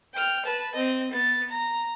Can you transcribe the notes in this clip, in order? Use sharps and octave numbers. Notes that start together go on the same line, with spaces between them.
G5 F6
B4 A5
C4 D#5
B3 A6
A#5